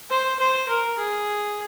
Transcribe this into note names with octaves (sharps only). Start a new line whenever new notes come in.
C5
C5
A#4
G#4